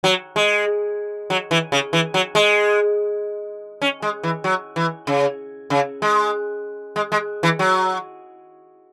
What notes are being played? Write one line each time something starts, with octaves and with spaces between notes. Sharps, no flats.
F#3
G#3
F#3
E3
C#3
E3
F#3
G#3
C#4
G#3
E3
F#3
E3
C#3
C#3
G#3
G#3
G#3
E3
F#3